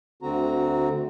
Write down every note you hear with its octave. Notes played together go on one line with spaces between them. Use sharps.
D2 D3 C4 F#4 A#5